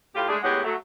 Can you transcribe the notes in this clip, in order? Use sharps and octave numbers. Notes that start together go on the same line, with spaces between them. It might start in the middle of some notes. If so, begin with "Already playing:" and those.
A2 F4 G4
G#3 A3 D4 G#4
E2 A2 G#3 G4 C#5 F#5
F#3 A3